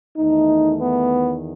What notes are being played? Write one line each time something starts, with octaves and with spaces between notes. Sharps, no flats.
E2 D#3 A3 D#4
B3